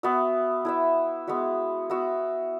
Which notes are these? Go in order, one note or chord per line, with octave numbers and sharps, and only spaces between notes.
B3 F#4 E5
E4 B4 E5
G#3 B3 F#4 E5
B3 F#4 E5